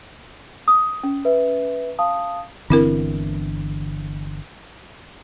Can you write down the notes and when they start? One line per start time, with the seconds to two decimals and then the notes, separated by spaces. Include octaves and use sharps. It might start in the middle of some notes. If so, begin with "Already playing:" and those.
0.68 D#6
1.03 C#4
1.25 B4 E5
1.99 F5 A5 D#6
2.70 G1 D3 E3 C4 E4 A#4